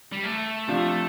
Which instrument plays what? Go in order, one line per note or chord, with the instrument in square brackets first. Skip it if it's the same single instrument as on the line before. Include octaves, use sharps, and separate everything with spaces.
[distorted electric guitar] G3
A3
[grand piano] C3 F3 D4 F4